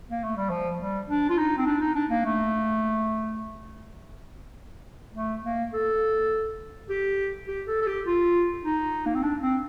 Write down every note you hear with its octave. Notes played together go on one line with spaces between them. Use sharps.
A#3
A3
G3
F3
G3
D4
F4
D#4
C4
D4
D#4
D4
A#3
A3
A3
A#3
A4
G4
G4
A4
A4
G4
F4
D#4
A#3
C4
D4
C4